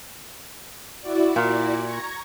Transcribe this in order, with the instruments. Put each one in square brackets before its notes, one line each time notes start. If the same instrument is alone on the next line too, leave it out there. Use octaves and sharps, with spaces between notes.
[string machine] E4 F#4 D5
[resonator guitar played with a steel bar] A#2
[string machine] A#5 C#6 G#6